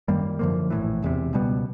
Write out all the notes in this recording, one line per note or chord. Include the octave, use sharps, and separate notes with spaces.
F#2 D#3 G3 A#3
F#2 D3 F3 A#3
A#1 A2 E3
E1 E2 C3
C#2 B2 G3 B3